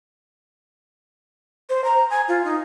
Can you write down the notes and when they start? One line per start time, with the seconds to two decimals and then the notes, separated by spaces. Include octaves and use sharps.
1.70 C5
1.84 A#5
2.10 G#5
2.28 F4
2.45 D#4